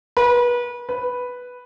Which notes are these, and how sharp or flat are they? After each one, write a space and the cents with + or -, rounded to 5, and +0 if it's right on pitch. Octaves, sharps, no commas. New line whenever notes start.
B4 -30
B4 +0